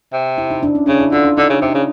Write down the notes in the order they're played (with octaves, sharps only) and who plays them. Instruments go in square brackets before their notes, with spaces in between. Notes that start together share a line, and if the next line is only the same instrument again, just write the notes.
[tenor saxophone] C3
[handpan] E4
D#4
D4
C#4
[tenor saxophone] C#3 [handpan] D4
[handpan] E4
[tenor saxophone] D3 [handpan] F4
[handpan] D4
[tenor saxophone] D3 [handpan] D#4
[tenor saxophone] C#3
[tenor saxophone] C3 [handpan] D#4
[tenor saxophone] C#3